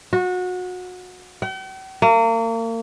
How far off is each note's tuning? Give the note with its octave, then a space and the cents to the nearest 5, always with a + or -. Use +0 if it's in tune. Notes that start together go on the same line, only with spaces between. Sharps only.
F#4 -25
G5 -45
A#3 -35